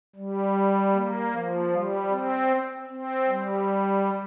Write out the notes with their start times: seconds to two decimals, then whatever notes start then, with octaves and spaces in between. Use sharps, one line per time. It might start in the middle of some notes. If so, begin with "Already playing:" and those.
0.16 G3
0.94 A#3
1.33 F3
1.72 G3
2.11 C4
2.89 C4
3.28 G3